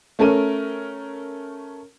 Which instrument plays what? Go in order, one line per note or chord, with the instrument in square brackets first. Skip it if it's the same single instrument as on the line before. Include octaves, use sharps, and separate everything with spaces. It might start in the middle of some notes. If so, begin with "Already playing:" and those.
[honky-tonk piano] A3 C#4 A4 A#4 D#7